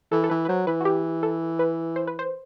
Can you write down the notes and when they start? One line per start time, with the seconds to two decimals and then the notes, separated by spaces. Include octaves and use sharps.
0.12 E3 A4
0.24 A4
0.30 E3 B4
0.45 B4
0.48 F#3 C5
0.67 E3 B4
0.81 F#4
0.85 G4
1.23 A4
1.59 B4
1.96 C5
2.07 B4
2.19 C5